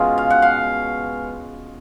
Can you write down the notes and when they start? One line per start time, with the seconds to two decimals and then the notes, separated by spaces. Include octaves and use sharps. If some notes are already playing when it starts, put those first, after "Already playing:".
Already playing: B2 G#3 C#4 F4
0.18 F5
0.30 F#5
0.42 F5